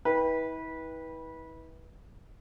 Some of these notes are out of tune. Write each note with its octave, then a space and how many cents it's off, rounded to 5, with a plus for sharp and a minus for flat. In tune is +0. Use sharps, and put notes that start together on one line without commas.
E4 -40 B4 -20 G5 +15